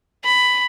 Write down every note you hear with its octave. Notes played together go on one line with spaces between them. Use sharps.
B5